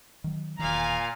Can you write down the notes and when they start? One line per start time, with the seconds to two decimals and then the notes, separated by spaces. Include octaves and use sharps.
0.24 D#3 F#3
0.59 E1 A#2 D#3 F5 G#5 A#5